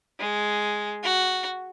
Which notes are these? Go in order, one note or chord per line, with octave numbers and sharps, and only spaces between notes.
G#3
F#4